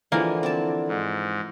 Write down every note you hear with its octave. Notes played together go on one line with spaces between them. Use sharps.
D3 E3 F3 G#3 A#3
C4 D5 A5
G#2